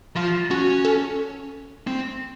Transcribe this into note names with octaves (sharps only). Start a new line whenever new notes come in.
F3 F4
C#4 F#4
A4
C4